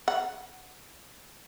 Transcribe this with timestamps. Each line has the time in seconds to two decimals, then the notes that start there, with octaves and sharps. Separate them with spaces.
0.08 F#5